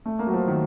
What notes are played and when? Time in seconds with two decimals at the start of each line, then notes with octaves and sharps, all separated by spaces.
0.06 A3
0.19 A#3
0.27 F#3
0.34 F3
0.48 D#3